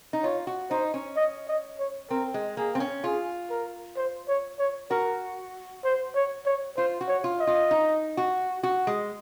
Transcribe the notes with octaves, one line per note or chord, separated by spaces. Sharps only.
D#4
F4 C#5
F#4
D#4 C5
C#4
D#5
D#5
C#5
C4 A#4
G#3
A#3 G#4
C4
C#4
F4 G#4
A#4
C5
C#5
C#5
F#4 A#4
C5
C#5
C#5
F4 C5
F#4
C#5
F4
D#5
F4
D#4
F#4
F#4
G#3